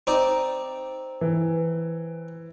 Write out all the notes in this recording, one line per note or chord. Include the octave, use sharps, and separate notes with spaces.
C4 D#4 D5
E3